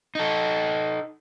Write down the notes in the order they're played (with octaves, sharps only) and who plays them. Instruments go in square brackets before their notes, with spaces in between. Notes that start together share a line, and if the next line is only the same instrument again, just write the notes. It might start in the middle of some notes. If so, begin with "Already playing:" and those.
[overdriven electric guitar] D#4 A4